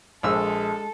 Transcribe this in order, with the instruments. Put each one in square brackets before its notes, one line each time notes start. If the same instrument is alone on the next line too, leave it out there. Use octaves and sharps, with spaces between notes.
[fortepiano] A#1 E6 [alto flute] G#3 [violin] A4